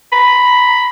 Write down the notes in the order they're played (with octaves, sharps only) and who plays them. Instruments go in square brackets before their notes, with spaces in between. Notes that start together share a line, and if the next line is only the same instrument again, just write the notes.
[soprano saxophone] B5